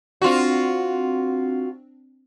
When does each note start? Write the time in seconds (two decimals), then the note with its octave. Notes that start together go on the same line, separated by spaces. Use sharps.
0.22 C4 D4 F4 F#4